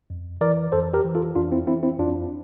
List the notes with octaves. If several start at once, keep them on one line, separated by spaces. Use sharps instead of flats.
F2
E3 A#4 D5
F2 A4 C5
G4 A#4
E3
F4 A4
F2 D4 F4
C4 E4
E3 C4 E4
C4 E4
F2 D4 F4